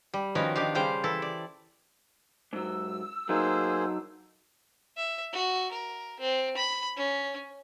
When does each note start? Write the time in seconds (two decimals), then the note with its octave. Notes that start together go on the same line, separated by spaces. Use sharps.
0.14 G3
0.35 D#3 F3 B3 C#4 F#4 A#4
0.55 D#3 D4 G4 F5
0.75 C#3 G3 C5 F5 G5
1.04 E3 E4 A4 A5
1.22 D5
2.53 G#2 F#3 E6
3.29 F#3 A#3 D#4 G#4 C5
4.97 E5
5.32 F#4
5.72 A#4
6.20 C4
6.57 B5
6.96 C#4